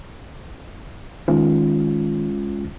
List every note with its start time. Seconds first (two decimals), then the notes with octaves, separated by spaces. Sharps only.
1.28 D#3 G#3 C#4 F4